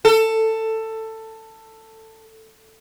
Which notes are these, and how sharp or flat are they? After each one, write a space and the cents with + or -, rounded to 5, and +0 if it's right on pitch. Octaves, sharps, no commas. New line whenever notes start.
A4 +15